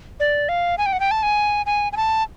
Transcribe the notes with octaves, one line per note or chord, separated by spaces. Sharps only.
D5
F5
G#5
G5
F#5
G5
A5
G#5
G#5
G#5
A5